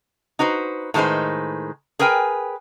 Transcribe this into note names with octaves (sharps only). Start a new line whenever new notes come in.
D#4 F#4 B4 C5
A2 D#3 G#3 E4 B4 C5
G#4 A#4 B4 G5 G#5